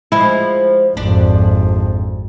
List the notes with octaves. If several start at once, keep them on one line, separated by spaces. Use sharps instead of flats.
F3 G#3 E4
G#1 F2 D4